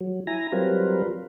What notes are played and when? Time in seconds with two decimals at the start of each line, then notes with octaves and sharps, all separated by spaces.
0.01 F#3
0.27 E4 G#5 A#5 A#6
0.52 F#3 G3 C4 F4 A#4 B4